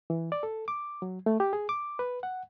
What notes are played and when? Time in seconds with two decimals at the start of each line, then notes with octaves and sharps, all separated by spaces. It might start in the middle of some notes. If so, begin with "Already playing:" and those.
0.10 E3
0.32 D5
0.43 A4
0.68 D6
1.02 F#3
1.26 A3
1.40 G4
1.53 G#4
1.69 D6
1.99 B4
2.23 F#5